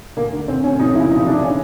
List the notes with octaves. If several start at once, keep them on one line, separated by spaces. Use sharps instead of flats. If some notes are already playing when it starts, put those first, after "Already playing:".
D2 A#3
D3
D2 C4
D3 C#4
F2 D#4
C#3 E3 E4
F2 D#4
C#3 E3 D4
C#4